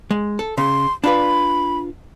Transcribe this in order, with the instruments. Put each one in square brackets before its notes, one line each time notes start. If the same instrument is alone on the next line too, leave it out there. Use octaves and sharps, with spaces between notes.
[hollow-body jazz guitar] G#3
A4
[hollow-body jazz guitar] C#3 [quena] C6
[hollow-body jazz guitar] D4 F4 B4 [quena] B5